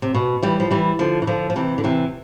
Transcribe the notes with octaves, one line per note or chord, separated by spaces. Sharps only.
C3
B2
E3 G3
F3
E3 G3
D3 F3
E3
D3 F3
F3
C3 E3
D3
C3 E3